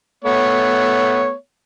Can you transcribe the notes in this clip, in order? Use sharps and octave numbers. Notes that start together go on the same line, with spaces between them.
A3 B3 C#5